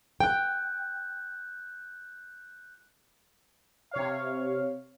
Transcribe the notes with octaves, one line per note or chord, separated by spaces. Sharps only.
G5 F#6 G6
C3 C#5 F5